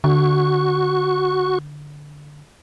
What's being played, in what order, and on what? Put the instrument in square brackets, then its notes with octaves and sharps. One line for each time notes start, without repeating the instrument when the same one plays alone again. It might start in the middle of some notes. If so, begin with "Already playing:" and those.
[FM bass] D3 [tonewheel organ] F#4 C#6